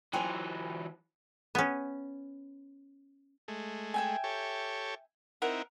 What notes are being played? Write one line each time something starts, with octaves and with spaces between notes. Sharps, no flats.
E3 F#3 C5 G5 G#5 A#5 C6
B3 C#4
G#3 A3
E5 G5 G#5
G4 A4 C#5
C4 D#4 E4 A#4 F#5